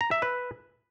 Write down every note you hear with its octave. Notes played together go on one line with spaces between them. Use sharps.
A#5
E5
B4